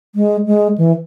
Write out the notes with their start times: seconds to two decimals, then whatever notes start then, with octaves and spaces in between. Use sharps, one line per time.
0.15 G#3
0.46 G#3
0.78 E3